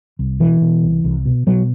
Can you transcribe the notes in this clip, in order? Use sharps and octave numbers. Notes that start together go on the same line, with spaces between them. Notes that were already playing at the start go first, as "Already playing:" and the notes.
C2
B2 E3
B2
C2
C2
B2
B2 F#3